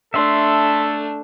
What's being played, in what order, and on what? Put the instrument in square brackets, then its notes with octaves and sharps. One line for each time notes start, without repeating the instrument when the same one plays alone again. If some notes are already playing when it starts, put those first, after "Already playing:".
[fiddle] A3 D4 [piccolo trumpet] A4 [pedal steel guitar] E5 C6